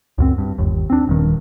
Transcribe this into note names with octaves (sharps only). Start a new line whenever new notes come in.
C#2 F#2 C4
G2
G1 D#2
C4 D4
D#1 G2 D#3